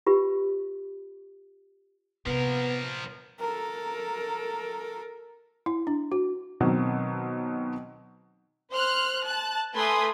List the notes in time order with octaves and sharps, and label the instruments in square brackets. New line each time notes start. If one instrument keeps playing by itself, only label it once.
[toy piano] F4 G4 B4
[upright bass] C3 [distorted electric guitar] F3 A#4 [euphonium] B3
[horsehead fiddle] A4 A#4
[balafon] E4
D4
F#4
[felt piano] B2 D#3 F#3 C4
[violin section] C5 F6 F#6
A5 F#6
A3 B4 G#5 C6 D#6